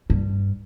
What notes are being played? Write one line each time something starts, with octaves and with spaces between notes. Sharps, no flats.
G2